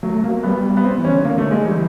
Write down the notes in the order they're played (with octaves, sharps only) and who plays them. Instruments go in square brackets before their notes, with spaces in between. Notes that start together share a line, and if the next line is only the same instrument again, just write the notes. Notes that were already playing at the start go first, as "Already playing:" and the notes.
[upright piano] F#3 [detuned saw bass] A3
[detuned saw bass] F#3 [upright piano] A#3
[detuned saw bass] G3 [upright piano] B3
[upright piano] B3
C4
[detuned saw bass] E3
[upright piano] C#4
[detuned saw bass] D3
[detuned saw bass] D3 [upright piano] A#3
[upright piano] A3
G#3
[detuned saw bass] E3 [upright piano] G3